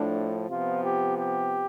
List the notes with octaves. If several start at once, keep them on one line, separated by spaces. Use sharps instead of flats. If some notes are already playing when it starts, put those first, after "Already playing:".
Already playing: A2 F3 A3 D4
C3 F3 B3 F4
G4
G4